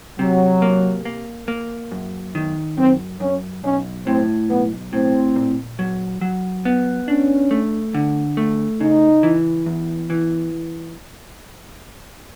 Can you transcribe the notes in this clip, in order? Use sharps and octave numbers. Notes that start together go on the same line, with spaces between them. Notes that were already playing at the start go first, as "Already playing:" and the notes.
C3 F#3
A#3
A#3
A#3
F#2
D#3
F#2 C4
F#2 C#4
B1 C#4
A2 C4
B1 B3
A2 C4
A#2
F#3
F#3
B3
C#4 D4
A3
D3
A3
C#3 D#4
E3
E2
E3